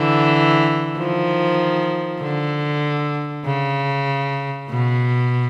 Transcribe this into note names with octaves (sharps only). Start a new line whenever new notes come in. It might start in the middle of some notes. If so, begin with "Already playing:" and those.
Already playing: D3 E3
D#3 F3
D3
C#3
B2